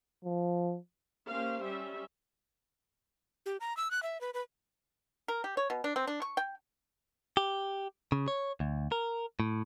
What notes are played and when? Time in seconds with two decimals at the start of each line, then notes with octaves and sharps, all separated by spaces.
0.25 F3
1.27 A#3 C#4 G4 C5 F5
1.64 G3 C#4 E5
3.46 G4
3.60 A#5
3.77 E6
3.91 F#6
4.03 E5
4.21 B4
4.34 B4
5.28 A#4
5.44 G4
5.57 C#5
5.70 B2
5.84 D4
5.96 C4
6.07 D4
6.22 C#6
6.37 G5
7.37 G4
8.12 C#3
8.28 C#5
8.60 D2
8.92 A#4
9.40 A2